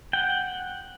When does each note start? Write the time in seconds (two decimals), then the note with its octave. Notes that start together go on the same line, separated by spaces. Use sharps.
0.13 F#5 G5